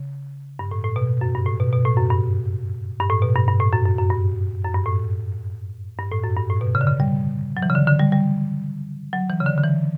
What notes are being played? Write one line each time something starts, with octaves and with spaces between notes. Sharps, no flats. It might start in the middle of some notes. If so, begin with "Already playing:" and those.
Already playing: C#3
G2
A2
A2
B2
F#2
G2
A2
B2
B2
A2
F#2
G2
G2
A2
B2
G2
G2
A2
F#2
F#2
F#2
G2
F#2
G2
A2
G2
A2
F#2
G2
A2
B2
C#3
D3
C#3
G3
F#3
E3
C#3
D3
D3
G3
G3
F#3
E3
C#3
D3
D3
E3